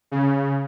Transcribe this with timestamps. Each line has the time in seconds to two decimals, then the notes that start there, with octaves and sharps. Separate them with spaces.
0.11 C#3